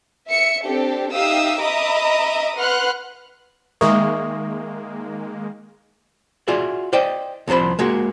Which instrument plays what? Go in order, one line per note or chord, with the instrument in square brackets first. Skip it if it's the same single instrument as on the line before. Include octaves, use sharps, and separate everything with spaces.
[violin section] E5 C#7
C4 D4 G4 A4
D#4 G4 E5 F5 D#6 E6
D#5 E5 A#5 B5 D6 D#6
B4 F#5 C6 F6 F#6
[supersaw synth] D#3 G#3 A#3 [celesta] E5 C#6 D#6
[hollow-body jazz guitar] F4 F#4 G#4 D5 E5
C5 D5 D#5 G5
C2 C3 F3 C5 B5
G#3 A#3 F#4